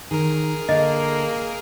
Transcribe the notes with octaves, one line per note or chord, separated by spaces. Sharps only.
D#3 G#4 A#4
D3 A#3 D#5